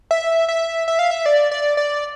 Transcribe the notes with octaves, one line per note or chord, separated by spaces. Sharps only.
E5
E5
E5
F5
E5
D5
D5
D5